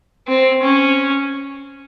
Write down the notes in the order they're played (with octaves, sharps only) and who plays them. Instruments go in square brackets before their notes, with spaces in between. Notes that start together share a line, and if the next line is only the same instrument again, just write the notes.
[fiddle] C4
C#4